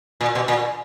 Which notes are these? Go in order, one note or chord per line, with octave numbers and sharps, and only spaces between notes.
A#2
B2
A#2